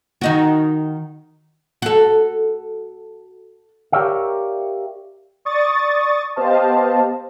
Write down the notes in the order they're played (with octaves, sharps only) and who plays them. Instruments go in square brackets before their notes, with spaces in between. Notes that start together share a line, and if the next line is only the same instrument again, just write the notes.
[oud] D#3 D#4 F#4
F#4 A4
[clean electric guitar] G4 A#4 C#5 D5 E5 F5
[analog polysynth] D5 C#6 D#6 A6
B3 G4 C5 D#5 F5 A5